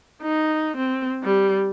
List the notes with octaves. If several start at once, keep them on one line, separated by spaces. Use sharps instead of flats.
D#4
C4
G3